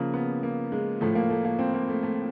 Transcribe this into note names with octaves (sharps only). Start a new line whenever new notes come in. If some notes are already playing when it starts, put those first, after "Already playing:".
Already playing: C#3 F3 A#3
B3
A#3
G#3
A2 F3 A3
A#3
A3
A#3
C4
A#3
A3
A3